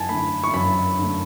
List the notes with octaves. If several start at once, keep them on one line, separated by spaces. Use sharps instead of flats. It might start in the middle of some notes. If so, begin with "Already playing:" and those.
Already playing: F#2 G#5 A5
D3 A3 B5
C#6
F#2 B5
D3 A3